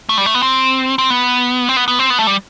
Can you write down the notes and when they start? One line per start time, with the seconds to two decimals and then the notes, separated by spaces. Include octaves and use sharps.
0.09 A3
0.18 G3
0.26 A3
0.34 B3
0.42 C4
0.98 C4
1.10 B3
1.69 C4
1.76 B3
1.88 B3
1.99 C4
2.10 B3
2.19 A3
2.27 G3